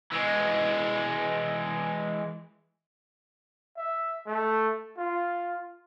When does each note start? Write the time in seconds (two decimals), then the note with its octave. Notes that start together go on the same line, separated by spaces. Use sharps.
0.12 E3 G#3
3.77 E5
4.27 A3
4.98 F4